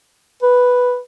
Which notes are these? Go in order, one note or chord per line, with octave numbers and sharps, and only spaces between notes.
B4